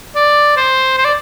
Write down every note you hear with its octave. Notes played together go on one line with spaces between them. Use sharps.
D5
C5
C5
D5